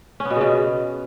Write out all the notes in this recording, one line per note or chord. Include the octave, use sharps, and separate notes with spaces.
C#4
B3
B2
C#3
B2